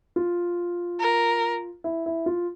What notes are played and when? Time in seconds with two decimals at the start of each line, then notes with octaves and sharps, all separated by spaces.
0.16 F4
1.00 A#4
1.84 E4
2.06 E4
2.26 F4